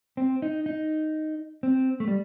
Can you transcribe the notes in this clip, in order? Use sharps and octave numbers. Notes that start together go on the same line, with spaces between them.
C4
D#4
D#4
C4
A3
G3